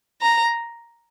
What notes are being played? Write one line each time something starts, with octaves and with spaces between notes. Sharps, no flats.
A#5